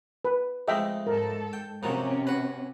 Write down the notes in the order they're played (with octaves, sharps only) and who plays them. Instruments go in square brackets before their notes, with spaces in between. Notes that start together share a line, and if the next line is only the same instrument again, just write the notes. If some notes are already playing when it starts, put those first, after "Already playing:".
[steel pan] B4
[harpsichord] F2 G#3 A3 [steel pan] D#5 E5 G5
[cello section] G#2 A4 [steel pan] A#4
[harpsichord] G5
[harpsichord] F2 D#3 F#3 [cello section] C3 C#4
[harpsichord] F#4 B4